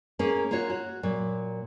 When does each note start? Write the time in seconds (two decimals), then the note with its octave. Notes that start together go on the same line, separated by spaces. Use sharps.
0.19 A#3 C#4 G#4
0.51 A#3 F4 F#4 C#5
0.70 F#4
1.03 A#2 F#3